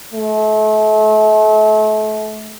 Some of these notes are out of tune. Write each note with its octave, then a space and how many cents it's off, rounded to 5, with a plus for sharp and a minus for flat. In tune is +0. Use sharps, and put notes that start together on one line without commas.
A3 -35